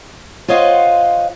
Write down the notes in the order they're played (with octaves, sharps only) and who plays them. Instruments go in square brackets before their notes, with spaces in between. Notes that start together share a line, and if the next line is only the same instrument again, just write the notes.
[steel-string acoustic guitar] F4 C5 C#5 D#5 F5 F#5